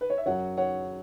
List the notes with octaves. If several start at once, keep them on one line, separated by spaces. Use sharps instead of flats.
B4
C#5
E5
F#2 F#3 C#5 F#5
C#5 F#5